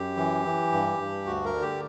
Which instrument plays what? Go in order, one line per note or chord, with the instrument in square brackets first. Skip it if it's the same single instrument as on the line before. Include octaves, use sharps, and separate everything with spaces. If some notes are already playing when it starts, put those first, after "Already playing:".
Already playing: [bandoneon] F#2 G4
E3
E3
G2
G2
D2 F#4
A#4
D3
G4